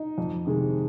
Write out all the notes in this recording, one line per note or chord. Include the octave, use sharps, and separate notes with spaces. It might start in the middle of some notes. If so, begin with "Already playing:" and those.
Already playing: D#4
F2
C3 D#3 G#3